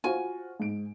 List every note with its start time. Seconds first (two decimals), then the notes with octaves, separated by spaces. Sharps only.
0.04 F4 F#4 C5 G#5
0.60 G#2 D7